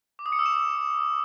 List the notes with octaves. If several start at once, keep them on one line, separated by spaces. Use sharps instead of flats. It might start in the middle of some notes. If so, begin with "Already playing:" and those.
D6
D#6
C#7
E6
E7